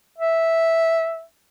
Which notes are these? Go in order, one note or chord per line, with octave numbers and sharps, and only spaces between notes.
E5